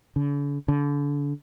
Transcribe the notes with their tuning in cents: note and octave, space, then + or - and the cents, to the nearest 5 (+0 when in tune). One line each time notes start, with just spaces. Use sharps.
D3 -45
D3 -30